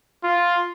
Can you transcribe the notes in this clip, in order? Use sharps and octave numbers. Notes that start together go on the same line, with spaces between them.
F4